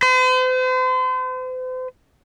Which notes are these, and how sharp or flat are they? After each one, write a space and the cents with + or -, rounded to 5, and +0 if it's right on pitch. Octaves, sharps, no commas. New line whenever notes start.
C5 -40